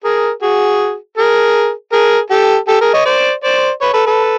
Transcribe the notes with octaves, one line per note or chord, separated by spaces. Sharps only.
G#4 A#4
F#4 G#4
G#4 A#4
G#4 A#4
G4 A4
G4 A4
G#4 A#4
C#5 D#5
C5 D5
C5 D5
B4 C#5
A4 B4
A4 B4